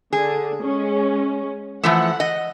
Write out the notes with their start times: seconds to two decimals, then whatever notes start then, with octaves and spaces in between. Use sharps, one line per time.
0.13 D3 G#4
0.62 G#3 C#4
1.83 E3 F3 A3 F#5
2.20 D#5